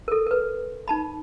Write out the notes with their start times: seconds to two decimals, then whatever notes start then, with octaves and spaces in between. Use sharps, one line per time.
0.08 A4 A#4
0.27 A#4 B4
0.88 D#4 A5 B5